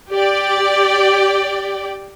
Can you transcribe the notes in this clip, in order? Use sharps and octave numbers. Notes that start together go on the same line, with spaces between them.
G4 D5 G5